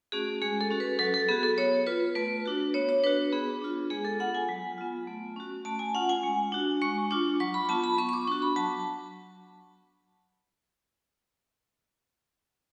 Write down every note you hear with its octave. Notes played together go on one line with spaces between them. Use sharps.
A3 C#4 F#4 G#4
G#3 G#4
A4
C#4 F#4
B4
F#3 A4
A4
B3 F#4 G#4
A4
B3 C#5
F4 B4
A3 B4
D4 F#4
B3 C#5
C#5
D4 F#4 B4
B3 G#4
D4 F4
G#3 G#4
A4
B3 F4 F#5
G#5
F#3
B3 F4
A3
C#4 F#4
A3 A5
G#5
C#4 F4 F#5
G#5
G#3
D4 F#4
G#3 C#6
D4 F4 D6
F#3 C#6
B5
B3 F4 A5
B5
B3 C#6
C#6
D6
D4 F#4 C#6
B5
F#3 A5